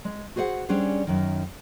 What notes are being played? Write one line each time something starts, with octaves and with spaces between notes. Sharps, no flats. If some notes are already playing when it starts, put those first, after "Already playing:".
G#3
F#4 G#4 C5 D#5 F#5
G3 C#4 D4 G#4 C5
F#2 D#3